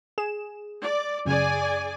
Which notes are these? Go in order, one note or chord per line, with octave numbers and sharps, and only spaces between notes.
G#4 E7
D5
F#2 C#3 G#4 D5 G#5